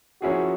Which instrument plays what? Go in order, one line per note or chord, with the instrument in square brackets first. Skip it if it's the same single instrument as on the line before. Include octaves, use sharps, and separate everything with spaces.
[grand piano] F3 A#3 C#4 E4 G#4 [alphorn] F#4